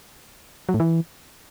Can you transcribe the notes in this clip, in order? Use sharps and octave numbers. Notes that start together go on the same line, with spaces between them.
F#3
A2
E3